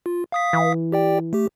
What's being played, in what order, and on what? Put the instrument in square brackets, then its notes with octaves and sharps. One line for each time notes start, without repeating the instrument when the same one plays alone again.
[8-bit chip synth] F4
F5 D#6 B6
[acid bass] E3
[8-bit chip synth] G4 D5 G5
A3 G4